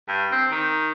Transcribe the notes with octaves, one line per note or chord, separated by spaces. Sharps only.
G2
C4
D#3